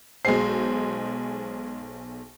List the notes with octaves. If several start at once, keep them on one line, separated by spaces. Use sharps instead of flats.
B1 G#3 G#4 C5 C7